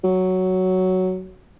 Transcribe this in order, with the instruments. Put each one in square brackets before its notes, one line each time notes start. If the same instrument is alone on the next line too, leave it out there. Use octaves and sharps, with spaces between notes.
[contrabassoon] F#3